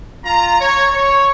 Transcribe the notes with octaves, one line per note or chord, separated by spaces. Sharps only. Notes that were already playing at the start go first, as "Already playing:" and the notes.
F4 A#5
C#5
C#5